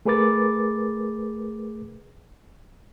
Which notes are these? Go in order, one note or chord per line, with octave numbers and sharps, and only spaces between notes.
A3 G#4 A#4 B4 D6 A6